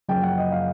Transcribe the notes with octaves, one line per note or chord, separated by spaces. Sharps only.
F#1 F#2 C#3 F3 G5
F#5
D#5
F5